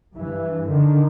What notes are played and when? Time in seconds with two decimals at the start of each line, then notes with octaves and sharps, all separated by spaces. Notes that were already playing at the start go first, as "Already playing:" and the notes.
0.14 G2 E3
0.66 D3 D#3